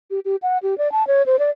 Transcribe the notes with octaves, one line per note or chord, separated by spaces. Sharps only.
G4
G4
F#5
G4
D5
A5
C#5
C5
D5